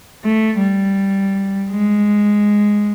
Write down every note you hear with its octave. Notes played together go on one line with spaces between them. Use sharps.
A3
G3
G#3